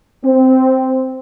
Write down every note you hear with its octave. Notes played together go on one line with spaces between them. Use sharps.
C4